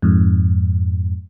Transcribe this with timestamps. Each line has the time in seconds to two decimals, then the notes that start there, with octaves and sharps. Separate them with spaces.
0.02 F2 G#2